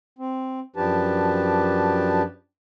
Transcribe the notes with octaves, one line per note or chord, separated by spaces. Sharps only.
C4
F#2 F3 D4 G4 B4 A5